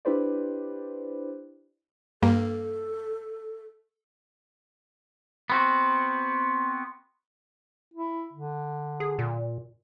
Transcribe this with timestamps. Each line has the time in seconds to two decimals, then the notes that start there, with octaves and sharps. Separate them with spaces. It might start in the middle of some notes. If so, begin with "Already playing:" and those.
0.05 D4 E4 G4 B4 C5 D5
2.22 G2 A#3 A4
5.50 B3 C4 F#4
7.94 E4
8.33 D3
9.00 G#4
9.19 A#2